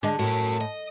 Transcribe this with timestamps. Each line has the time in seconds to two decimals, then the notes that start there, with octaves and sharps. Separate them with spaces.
0.03 D3 G#3 A5
0.19 A2 F#4 A#4
0.61 D#5